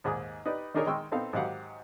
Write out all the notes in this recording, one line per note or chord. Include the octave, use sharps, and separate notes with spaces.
D#2 G#2 G#4 D6 D#6
D#4 G4 B4 D5
D#3 D4 D#4 G#4 A#4 C#5
D#3 G#3 G5 C6 C#6 E6
B3 C4 D#4 A4 F5 G5
G#2 D#3 F#3 G4 F5 F#5